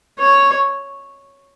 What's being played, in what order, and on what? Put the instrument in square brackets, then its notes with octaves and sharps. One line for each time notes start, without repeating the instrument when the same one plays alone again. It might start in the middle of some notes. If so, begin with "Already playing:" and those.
[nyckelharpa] C#5